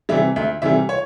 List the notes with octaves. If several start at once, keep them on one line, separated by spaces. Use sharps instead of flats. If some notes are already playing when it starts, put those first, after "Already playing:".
C3 E3 G3 E5
D2 E5
C3 E3 G3 E5
C#5